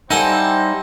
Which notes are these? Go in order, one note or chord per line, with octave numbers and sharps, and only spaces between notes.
G3 C4 D#4 E4 A4 C5 F#5 G#5